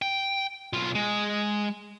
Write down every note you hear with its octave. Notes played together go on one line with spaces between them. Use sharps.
G5
B1 F4
G#3